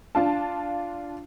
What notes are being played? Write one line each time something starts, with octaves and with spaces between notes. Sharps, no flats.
D4 F4 A5